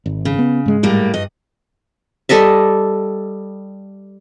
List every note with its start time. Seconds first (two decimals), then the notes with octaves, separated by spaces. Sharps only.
0.06 G#1
0.25 C#3
0.39 B3
0.66 G#2 G#3
0.83 A2 G3 A#3
1.14 G2 D#5
2.29 G3 A4 D#5 E5